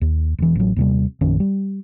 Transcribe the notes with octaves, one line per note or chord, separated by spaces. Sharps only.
D#2
E1 E3
A1 F#3
D#2 C3 G3
A#1 F#2 D#3 C#4
G3